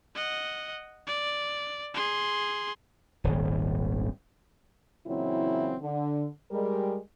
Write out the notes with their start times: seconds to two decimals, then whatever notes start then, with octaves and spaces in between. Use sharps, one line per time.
0.15 D#5 F#5
1.07 D5
1.94 G#4 C6
3.24 D#1 G#1
5.07 A#2 C#3 E3 F#3 C4 E4
5.82 D3
6.51 G3 G#3 A#4